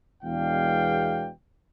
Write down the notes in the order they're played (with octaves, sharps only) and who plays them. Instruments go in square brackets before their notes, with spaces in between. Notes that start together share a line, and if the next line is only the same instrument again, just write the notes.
[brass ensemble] E2 B2 G#3 D4 F5 G5